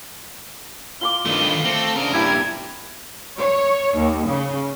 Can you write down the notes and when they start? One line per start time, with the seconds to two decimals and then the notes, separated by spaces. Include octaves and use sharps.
1.01 F4 C6 D6 G7
1.26 G2 D#3 A3 B4
1.65 A3 C4 G7
1.96 C#3 D4 A#4
2.14 G2 A#2 E4 G4 G#6
3.38 C#5
3.95 D#2
4.27 C#3